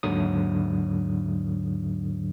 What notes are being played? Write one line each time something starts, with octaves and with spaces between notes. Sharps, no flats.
D#2 G#2 D3 F#3 D#6